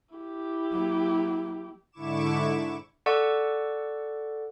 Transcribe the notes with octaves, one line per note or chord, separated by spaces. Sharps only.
E4 G4
F#3 A#3
G#2 D3 E4 C#6 D6 E7
A4 D5 F#5 C#6 E6